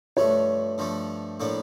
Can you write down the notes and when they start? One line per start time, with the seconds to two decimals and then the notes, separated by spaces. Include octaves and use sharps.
0.17 G2 F3 A3 C#5
0.78 G2 F3 A3
1.40 A2 F3 A#3 D4